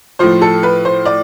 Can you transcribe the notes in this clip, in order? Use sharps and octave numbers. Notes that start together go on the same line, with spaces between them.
A2 F3 C5
A4
B4
C5
D5